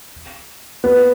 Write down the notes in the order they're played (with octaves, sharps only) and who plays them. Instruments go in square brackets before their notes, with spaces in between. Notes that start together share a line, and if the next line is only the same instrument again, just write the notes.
[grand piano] B3